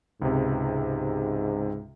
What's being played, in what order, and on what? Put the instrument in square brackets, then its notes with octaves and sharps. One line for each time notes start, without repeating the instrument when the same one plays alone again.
[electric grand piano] C#2 C3 [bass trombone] G#2